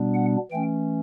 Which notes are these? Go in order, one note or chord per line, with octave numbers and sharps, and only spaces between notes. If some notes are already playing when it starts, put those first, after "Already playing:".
Already playing: B2 G3 B3 D4
F#5
E3 A3 C#4 G5